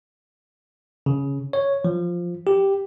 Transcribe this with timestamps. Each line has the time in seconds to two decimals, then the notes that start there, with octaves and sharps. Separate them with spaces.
1.06 C#3
1.53 C#5
1.85 F3
2.47 G4